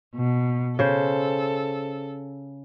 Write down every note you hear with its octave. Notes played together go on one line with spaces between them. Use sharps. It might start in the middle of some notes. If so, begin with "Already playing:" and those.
B2
C#3 A4 C5